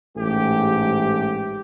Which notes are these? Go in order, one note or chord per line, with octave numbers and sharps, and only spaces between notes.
A1 G#2 A3 G4